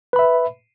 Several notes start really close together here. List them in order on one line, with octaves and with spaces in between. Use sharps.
B4 B5 E5